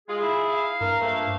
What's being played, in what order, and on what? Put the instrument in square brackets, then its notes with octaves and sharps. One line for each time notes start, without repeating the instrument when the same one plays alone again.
[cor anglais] G#3 [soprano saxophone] F4 [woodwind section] G#4
[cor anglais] E4
[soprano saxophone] F5
[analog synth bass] G2 [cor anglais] A#4
[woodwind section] F3 A#3 [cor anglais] A3